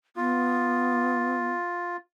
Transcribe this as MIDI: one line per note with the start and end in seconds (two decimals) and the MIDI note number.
0.16 1.50 59
0.16 1.97 65